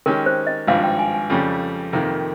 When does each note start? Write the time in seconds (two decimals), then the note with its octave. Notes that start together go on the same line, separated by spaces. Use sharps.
0.06 D#3 G#3 C#4 G4 A#4
0.26 C5
0.47 D#5
0.67 G#1 G2 F3 F5
0.84 G5
0.99 G#5
1.14 G#5
1.30 F2 C#3 G3
1.93 F2 C3 D#3 A#3